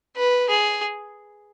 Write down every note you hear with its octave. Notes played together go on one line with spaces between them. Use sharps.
B4
G#4